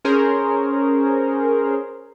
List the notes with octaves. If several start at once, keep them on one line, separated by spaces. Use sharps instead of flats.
C#4 G#4 A#4 C5 C#5